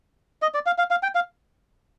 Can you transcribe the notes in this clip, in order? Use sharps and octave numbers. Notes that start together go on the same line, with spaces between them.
D#5
D5
F5
F5
F5
G5
F5